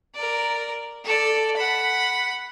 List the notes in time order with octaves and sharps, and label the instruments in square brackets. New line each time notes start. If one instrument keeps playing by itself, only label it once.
[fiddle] A#4 D5
A4 D5
F#5 B5